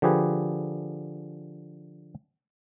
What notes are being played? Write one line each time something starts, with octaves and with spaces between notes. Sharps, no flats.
D3 F3 G4 G#4 B4